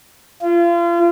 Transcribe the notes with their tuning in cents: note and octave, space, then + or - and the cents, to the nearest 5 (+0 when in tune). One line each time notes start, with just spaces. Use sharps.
F4 -35